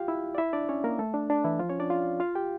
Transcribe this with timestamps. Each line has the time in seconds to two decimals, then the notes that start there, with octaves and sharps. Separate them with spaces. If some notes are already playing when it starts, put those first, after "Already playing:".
Already playing: F4 G4 F5 G5
0.08 E4 E5
0.35 D5
0.38 E4 E5
0.53 D4 D5
0.69 C#4 C#5
0.84 A#3 A#4
0.99 A3 A4
1.14 D4
1.30 D4
1.44 E3 E4
1.60 F3 F4
1.70 C#4 C#5
1.80 D4 D5
1.90 F4 F5
2.20 F4 F5
2.35 G4 G5